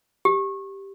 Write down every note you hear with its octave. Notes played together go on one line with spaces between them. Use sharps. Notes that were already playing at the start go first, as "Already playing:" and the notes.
G4